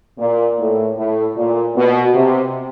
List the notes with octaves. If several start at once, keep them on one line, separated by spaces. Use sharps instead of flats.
A#2
A2
A2
A#2
B2
C3